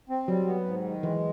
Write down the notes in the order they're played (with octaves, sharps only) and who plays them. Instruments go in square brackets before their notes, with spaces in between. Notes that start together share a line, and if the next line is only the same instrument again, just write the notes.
[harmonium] C4
[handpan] F#3 [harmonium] G3
[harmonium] B3
G#2
D#3
[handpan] E3 [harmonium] G#3